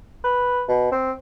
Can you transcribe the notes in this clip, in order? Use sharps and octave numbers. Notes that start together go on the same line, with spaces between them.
B4
B2
C4